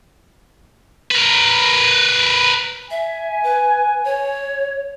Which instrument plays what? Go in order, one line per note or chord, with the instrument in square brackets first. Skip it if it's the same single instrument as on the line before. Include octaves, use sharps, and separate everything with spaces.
[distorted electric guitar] A#4 B4
[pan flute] E5 [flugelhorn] G#5
[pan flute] B4
C#5